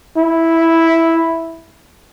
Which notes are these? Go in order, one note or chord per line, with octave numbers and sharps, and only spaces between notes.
E4